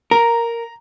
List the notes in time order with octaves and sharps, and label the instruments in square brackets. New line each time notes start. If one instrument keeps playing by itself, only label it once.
[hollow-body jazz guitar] A#4 [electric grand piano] A#5